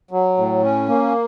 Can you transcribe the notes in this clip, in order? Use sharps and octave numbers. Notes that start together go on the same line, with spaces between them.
F#3
A2
C#4
A#3